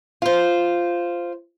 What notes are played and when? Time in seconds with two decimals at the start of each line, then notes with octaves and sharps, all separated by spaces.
0.22 F4 C5